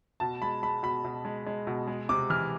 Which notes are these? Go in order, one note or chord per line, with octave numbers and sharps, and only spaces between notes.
B2 A5
G#3 B5
G#3 B5
B2 B5
B2
G#3
G#3
B2
G#3
C3 D6
E3 F6